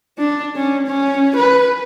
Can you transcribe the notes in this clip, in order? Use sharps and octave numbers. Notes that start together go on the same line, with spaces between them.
D4
C#4
C#4
B4